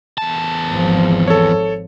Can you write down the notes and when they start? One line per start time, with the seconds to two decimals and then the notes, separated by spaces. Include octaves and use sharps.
0.18 E2 A5
0.71 G#1 F3
1.27 A4 C#5